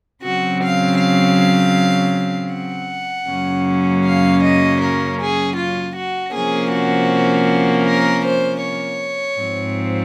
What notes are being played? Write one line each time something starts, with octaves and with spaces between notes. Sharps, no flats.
C#3 F#3 C4 F#4
F5
F5
F#5
F#2 C#3 F#3 A#3 C#4
F5
D#5
A#4
G#4
F4
F#4
C3 F3 A#3 C#4 G#4
F#4
A#4
C5
C#5
G#2 F3 C4